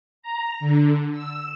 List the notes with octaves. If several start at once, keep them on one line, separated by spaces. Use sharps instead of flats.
A#5
D3
E6